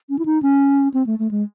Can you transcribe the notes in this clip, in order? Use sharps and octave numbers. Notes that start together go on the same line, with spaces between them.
C#4
E4
D#4
C#4
C4
A3
A3
G#3